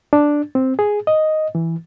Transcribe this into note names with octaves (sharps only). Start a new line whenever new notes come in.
D4
C4
G#4
D#5
E3